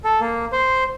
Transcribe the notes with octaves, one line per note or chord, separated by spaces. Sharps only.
A4
A#3
C5